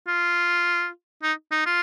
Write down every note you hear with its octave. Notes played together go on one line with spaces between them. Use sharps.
F4
D#4
D#4
F4